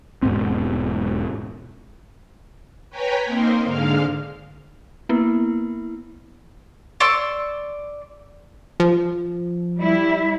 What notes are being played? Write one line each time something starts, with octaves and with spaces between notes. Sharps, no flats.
E1 G#2 B2 C4
B4 C#5 G5 G#5 A#5 B5
A#3 C4 D#4 A#4 C5
G#2 D3 G#3 F5 F6
A#3 B3 E4
D5 C6 C#6 E6
F3
G3 E4